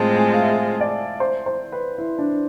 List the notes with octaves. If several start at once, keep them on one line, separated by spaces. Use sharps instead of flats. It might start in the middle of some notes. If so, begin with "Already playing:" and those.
Already playing: A2 G#3 C4 F4 G#5 A5
G#5
F5
E5
D5
C5
C5
B4
E4
D4